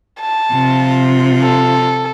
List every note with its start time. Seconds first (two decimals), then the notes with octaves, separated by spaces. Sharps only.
0.21 A5
0.53 C3 F3 F4
1.42 A4